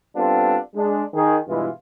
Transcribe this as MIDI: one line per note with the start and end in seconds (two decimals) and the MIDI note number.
0.15 0.57 55
0.15 0.57 59
0.15 0.57 60
0.15 0.57 62
0.15 0.57 65
0.15 0.57 69
0.74 1.02 56
0.74 1.02 62
1.13 1.36 51
1.13 1.36 68
1.47 1.68 43
1.47 1.68 47
1.47 1.68 52
1.47 1.68 56
1.47 1.68 64
1.47 1.68 65